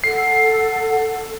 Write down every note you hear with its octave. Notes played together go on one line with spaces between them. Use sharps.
A4 F#5 C7